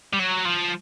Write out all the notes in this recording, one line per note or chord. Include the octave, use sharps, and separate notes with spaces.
G3
F#3
F3